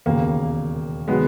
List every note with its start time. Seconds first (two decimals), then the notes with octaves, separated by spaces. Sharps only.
0.06 E1 D#2 C#3 A#3
1.08 D#3 F#3 G#3 B3